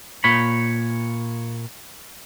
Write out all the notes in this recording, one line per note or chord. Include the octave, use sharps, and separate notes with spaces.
A#2 C#5 B5